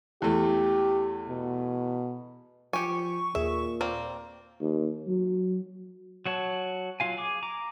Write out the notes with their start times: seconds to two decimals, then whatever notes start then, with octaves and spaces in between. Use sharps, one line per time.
0.22 E2 A3 G4
1.28 B2
2.73 F3 G4 G#5 C#6
3.35 D#2 A#2 G#4 E5
3.81 A#3 C4 D5
4.61 D#2
5.08 F#3
6.26 F#3 F#4 C#5 A5
7.00 F#3 F4 F5 G#5
7.18 G#4 G#5 D6
7.43 A#5 D6